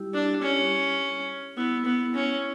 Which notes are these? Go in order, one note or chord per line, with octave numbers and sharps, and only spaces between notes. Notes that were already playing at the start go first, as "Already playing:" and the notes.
Already playing: G3 E4 G4
D4
C#4
B3 E4
B3
C#4